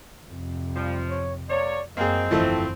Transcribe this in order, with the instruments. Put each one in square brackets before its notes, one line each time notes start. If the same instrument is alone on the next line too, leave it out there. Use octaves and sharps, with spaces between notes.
[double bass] F2 C3
[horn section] F3 [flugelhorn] G3
[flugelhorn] C#5
[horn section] C3 A#3 C#5 [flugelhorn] D5
[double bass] F#2 [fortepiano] A#3 G#4 [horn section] C4 [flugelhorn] D#5
[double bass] G1 F2 [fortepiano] E3 F3 A3